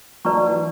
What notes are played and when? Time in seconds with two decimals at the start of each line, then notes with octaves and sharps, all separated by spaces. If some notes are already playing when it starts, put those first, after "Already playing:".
0.25 F#3 B4 D5 A5 C#6
0.48 E3